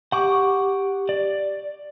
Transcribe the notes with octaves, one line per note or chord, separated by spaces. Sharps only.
G4 F#5 C#6 D6
D5